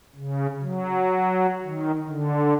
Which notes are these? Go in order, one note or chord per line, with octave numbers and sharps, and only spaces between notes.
C#3
F#3
D#3
D3